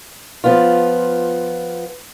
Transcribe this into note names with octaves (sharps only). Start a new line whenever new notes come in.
F3 B3 F4